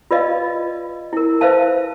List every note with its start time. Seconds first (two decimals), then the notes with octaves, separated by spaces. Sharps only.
0.11 F4 B4 D5 D#5 F5
1.13 E4 A#4
1.41 B4 C5 E5 F5 A5